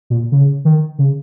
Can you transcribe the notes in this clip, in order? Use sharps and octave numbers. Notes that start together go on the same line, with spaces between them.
A#2
C#3
D#3
C#3